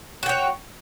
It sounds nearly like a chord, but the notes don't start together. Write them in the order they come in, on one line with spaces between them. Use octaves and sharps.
F#4 G5 C#5